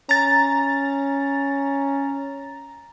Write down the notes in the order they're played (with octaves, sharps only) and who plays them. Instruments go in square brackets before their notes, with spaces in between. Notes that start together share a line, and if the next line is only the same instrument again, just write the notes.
[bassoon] C#4 [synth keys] A#5 A6